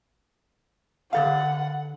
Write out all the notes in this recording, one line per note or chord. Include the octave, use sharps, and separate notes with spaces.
D3 A4 F5 F#5